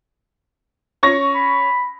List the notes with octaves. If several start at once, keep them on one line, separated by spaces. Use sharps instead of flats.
C#4 C#6 A#6
B5